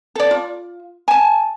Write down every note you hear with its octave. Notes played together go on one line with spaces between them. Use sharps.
A4 D5
F4
G#5 A5